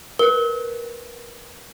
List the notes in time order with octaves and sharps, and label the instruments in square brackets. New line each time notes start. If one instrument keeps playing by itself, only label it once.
[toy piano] A#4 [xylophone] B4 G7